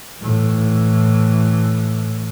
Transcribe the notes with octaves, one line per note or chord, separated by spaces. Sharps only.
A2 E3